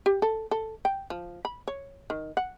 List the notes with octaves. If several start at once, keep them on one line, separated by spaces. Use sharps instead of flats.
G4
A4
A4
G5
F3
B5
C#5
D#3
F#5